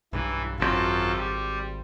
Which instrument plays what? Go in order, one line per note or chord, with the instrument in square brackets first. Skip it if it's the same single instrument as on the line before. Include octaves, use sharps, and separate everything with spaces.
[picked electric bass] B1 G2 [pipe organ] E3
[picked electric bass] G#1 D#3 C4 [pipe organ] F#2 F4 A4
[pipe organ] G3